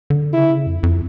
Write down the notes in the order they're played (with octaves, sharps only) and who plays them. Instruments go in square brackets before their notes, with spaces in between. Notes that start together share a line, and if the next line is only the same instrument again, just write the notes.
[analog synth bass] D3
[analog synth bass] C#3 [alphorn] E4
[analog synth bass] D3
C#3
F2
F2